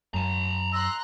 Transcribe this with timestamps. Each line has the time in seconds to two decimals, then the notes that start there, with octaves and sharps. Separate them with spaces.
0.14 F#2 A5 A#5
0.73 A#5 C6 E6 F#6